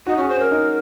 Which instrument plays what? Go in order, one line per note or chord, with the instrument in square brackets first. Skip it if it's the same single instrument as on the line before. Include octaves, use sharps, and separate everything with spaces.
[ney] D#4 [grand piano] F#4
[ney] C#4
[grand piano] G#4
[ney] C5
[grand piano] C#4 [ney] A#4
[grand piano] D#4